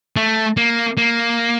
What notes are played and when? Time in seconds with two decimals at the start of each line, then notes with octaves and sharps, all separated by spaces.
0.16 A3
0.57 A#3
0.97 A#3